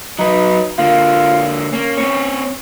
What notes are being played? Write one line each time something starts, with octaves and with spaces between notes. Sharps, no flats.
F#3 D#4 B4
D3 A#3 F4
A#3 C#4
C4 C#5